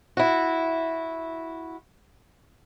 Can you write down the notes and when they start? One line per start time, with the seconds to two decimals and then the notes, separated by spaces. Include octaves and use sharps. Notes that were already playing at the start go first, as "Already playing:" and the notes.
0.17 E4 F#4